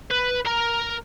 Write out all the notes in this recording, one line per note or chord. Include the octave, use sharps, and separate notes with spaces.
B4
A#4 A#5